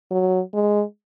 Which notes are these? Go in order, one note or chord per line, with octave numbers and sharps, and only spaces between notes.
F#3
G#3